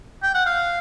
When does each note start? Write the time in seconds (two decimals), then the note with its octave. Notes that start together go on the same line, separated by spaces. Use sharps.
0.23 G5
0.34 F#5
0.46 F5